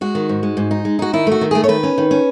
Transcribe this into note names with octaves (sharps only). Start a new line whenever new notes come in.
G#3 F#4
D#3
G#2
G#3
G#2
D#4
G#3
D#4 F#4
D#3 E4
A3 F#4
D#3
A3 G#4
C#5
D#3 B4
C#4
D#3
C#4